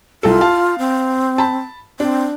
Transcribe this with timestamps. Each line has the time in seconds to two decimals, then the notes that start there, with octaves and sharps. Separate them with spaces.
0.23 C2 F4 A4
0.41 F5 A5
0.79 C4
1.38 A5 B5
2.00 C4 D4